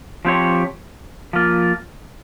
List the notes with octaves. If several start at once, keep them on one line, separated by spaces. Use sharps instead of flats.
F3 C4 G4 C#5
F3 A#3 F4